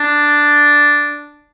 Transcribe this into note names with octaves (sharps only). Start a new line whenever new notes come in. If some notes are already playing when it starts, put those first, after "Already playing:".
Already playing: D4